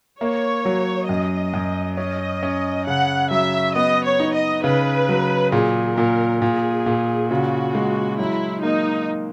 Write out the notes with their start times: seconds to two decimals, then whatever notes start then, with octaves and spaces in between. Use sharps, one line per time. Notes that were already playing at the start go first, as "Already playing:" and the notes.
0.21 A#3 C#5
0.65 F#3
1.09 F#2 D#5
1.54 F#2
1.97 C#4 D#5
2.43 C#4
2.87 C#3 F#5
3.31 F#3 E5
3.75 B3 D#5
4.05 C#5
4.20 D#4
4.35 D#5
4.64 C#3 B4
5.09 F#3
5.52 A#2 G#4
5.97 A#2 A#4
6.42 A#2 G#4
6.86 A#2
7.30 C#3 F#4
7.75 G#3
8.19 F#3 E4
8.63 A#3 D#4